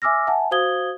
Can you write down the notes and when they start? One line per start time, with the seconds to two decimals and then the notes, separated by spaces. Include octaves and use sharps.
0.02 E5 G#5 D6 E6 F6 A#6
0.27 E5 F#5 G#5 A5
0.51 F#4 C5 F5 D#6 G#6 G7